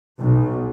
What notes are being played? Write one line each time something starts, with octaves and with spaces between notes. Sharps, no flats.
B1